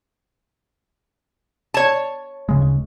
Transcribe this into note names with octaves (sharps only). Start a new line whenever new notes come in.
C#5 A5
D1 C#3 G#3